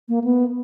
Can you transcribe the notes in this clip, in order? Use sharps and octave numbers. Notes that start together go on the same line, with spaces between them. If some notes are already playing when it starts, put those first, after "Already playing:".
A#3
B3